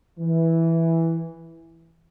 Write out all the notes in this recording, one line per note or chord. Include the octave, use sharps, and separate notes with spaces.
E3